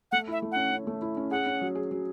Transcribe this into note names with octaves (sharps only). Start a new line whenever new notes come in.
A3 F#5
E4 E5
A3
C#4 F#5
C#4
A3
E4
C#4
G#4 F#5
C#4
F#3
G#4
F#3